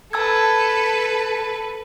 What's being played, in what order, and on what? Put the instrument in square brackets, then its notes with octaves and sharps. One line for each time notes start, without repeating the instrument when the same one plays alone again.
[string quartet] A4 B4 [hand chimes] A5 E6 G#6